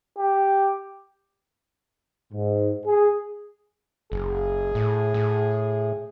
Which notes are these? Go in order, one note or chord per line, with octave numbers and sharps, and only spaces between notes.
G4
G#2
G#4
F#1 G#4
A2
A2